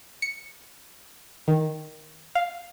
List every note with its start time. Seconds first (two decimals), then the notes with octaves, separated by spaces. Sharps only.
0.22 C#7
1.48 D#3
2.35 F5